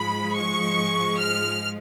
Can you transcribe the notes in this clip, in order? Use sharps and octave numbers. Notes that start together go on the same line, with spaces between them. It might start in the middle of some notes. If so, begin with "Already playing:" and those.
Already playing: G#2 F3 G#3 B5
C#6
F6